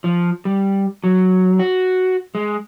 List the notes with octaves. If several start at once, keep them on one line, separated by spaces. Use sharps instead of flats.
F3
G3
F#3
F#4
G#3